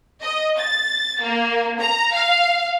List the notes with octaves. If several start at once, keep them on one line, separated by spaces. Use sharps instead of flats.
D#5
A6
A#3
A#5
F5